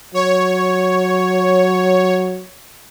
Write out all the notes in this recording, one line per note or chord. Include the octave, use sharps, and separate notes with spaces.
F#3 C#5